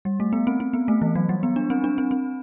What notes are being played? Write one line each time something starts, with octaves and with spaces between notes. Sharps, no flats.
G3
A3
B3
C4
C4
B3
A3
E3
F#3
G3
B3
D4
C4
D4
C4
C4